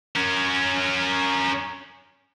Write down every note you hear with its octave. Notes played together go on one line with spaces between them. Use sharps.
C#4 A#4